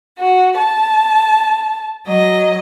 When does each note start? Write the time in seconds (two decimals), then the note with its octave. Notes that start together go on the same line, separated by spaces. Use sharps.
0.18 F#4
0.57 A5
2.05 F#3 D#5